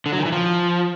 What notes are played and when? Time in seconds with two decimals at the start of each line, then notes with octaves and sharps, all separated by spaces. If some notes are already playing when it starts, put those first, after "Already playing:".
0.06 D3
0.12 F#3
0.19 D#3
0.26 E3
0.32 F3